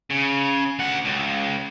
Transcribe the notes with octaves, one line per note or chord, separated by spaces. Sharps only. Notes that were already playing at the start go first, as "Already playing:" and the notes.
C#3
D2 F#5
C#2